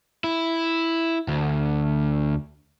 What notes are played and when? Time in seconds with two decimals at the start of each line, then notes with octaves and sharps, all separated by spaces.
0.24 E4
1.28 D2